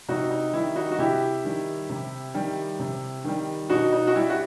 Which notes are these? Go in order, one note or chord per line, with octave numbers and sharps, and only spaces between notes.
C3 D#4 F#4
D#4
D#3 G3 E4
D#4 F#4
F#4
C3 E4 G4
D#3 G3
C3
D#3 G3
C3
D#3 G3
B2 D#4 F#4
D#4
F#4
G3 E4
F#4